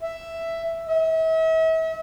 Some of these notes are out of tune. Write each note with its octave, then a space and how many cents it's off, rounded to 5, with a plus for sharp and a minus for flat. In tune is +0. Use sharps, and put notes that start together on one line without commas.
E5 +5
E5 -40